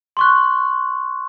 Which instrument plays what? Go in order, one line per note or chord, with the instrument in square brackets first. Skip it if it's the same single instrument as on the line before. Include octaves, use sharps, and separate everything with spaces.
[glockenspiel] C6 C#6 F#6